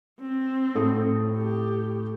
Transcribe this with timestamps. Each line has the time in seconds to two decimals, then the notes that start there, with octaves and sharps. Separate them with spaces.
0.20 C4
0.75 A2 A4 D#6
1.38 G4